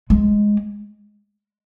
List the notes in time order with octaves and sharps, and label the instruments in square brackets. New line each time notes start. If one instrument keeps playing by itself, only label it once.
[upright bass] G#3